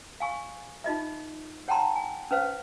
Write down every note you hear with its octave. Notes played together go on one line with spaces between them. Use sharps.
F5 G#5 C#6
D#4 F4 D#5 E5
C#5 F#5 G5 A5 A#5 C6
G#5
C#4 B4 C5 F5